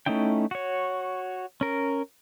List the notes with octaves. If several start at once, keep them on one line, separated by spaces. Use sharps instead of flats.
A3 C#4 D#4 E4 G5
F#4 C#5
C#4 A#4